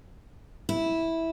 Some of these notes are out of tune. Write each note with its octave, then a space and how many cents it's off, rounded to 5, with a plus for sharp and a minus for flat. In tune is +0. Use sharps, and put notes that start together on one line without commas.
E4 -10